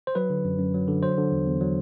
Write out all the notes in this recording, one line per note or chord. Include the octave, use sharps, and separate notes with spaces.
C5
F#3 B4
D3
F#2
F#2
F#3
D3
F#3 C5
D3
E2
E2
F#3